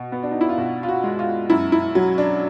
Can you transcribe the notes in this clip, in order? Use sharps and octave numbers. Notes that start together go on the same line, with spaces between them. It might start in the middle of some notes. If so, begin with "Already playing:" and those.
Already playing: B2
B3
D4
D#4
E4
F4
B2 F#4
F4
F#4
G#3
F4
F#2 E4
E4
F#3
D4